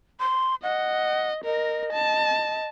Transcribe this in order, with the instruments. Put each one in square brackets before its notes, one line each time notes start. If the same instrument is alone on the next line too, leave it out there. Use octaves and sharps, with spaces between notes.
[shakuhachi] C6
[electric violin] D#5 [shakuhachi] F#5
[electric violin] A#4 [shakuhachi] D#5
[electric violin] A5